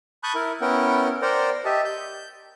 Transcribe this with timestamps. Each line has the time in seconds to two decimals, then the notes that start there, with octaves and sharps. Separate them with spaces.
0.24 A5 B5 C#6 D#6 F#6 G6
0.35 E4 A#4
0.61 B3 C#4 E4 A#4 F#5 G5
1.22 A#4 C5 D5 F#5 G5 A#5
1.65 G4 D#5 E5 A5
1.85 G6